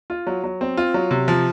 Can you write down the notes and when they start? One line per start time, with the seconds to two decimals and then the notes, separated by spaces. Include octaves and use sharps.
0.10 F4
0.27 F#3
0.44 F#3
0.61 C4
0.77 F4
0.94 F#3
1.11 C3
1.28 F3